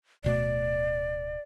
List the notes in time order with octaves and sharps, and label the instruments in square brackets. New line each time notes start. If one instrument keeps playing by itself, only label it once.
[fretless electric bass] D1 B2 A3 [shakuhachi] D5